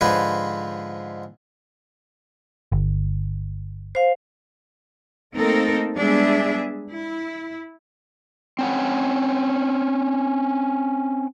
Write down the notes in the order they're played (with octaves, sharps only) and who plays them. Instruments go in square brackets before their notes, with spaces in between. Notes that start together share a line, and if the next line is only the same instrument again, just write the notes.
[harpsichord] G#2 D3 F3 C4 B4 G#5
[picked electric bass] G1
[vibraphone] C5 F5
[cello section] A3 A#3 C4 D#4 A4 A#4
G3 G#3 B3 D4 G#4 E5
E4
[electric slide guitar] C4 C#4 F#5